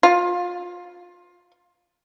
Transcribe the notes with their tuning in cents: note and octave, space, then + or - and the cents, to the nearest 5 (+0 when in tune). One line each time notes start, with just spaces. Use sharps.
F4 +25